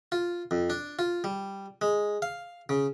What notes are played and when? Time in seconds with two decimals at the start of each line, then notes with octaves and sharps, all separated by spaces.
0.12 F4
0.51 F2
0.70 D4
0.99 F4
1.24 G3
1.82 G#3
2.22 F5
2.69 C#3